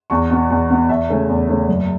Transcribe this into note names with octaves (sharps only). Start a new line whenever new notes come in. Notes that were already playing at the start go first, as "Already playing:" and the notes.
E2 A5 C#6
B2 B3
E2
B2 B3
E2 E5 A5
C#3 A3 C#4
E2
C#3 A3 C#4
F#1